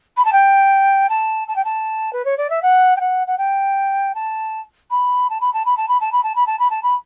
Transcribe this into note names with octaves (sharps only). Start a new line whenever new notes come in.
B5
A5
G5
A5
A5
G5
A5
B4
C#5
D5
E5
F#5
G5
F#5
F#5
G5
A5
B5
A5
B5
A5
B5
A5
B5
A5
B5
A5
B5
A5
B5
A5
B5